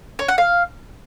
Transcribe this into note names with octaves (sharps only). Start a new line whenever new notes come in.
C#5
F#5
F5